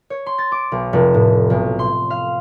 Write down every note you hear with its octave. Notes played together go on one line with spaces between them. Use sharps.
C#5
C6
A6
D6
B1
F1
A2
B1
C6
F5